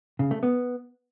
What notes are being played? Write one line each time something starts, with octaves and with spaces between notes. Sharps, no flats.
C#3
A3
B3